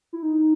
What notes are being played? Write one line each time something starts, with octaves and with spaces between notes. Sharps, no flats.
E4
D#4